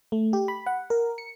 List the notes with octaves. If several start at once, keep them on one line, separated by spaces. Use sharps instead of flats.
A3
G4
B5
F#5
A#4
C#7